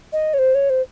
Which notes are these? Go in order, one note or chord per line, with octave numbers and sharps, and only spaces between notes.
D#5
C#5
C5
C#5
C5